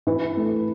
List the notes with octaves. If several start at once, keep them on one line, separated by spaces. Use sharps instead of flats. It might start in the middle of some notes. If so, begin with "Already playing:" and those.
E3 B4
A3